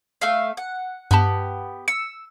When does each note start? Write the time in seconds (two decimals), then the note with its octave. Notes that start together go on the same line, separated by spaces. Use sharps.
0.21 A3 E5 F5
0.57 F#5
1.11 G2 B3 G4 A5
1.88 E6 C#7